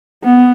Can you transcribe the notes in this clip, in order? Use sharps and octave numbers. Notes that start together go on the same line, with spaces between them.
B3